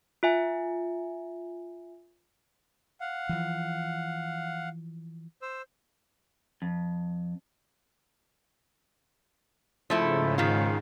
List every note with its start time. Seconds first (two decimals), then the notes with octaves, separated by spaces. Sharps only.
0.23 F4 E5 G#5
3.01 F5 F#5
3.29 E3 F3
5.42 C5 E6
6.62 F2
9.90 G#2 C#3 F3 A3 E4
10.38 D#3 F4